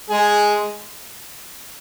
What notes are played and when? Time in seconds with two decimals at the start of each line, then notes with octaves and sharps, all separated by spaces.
0.09 G#3 G#4